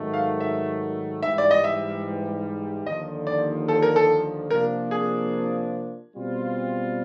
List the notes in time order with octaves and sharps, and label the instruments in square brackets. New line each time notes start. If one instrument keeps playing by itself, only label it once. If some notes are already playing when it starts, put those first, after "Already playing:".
Already playing: [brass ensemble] G#2 D#3 F#3 A3
[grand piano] F5
E5
[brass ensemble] G#2 E3 G3 [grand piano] E5
[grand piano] D5
D#5
E5
[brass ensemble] D#2 D3 F3 [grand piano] D#5
[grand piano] D5
A4
A#4
A4
[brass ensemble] C3 F3 A#3 D4 [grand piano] A#4
[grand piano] G#4
[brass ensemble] B2 G3 C4 F4